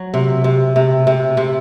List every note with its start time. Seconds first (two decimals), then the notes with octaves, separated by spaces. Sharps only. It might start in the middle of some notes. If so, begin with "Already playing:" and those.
Already playing: F#3
0.14 C3
0.44 C3
0.76 C3
1.07 C3
1.37 C3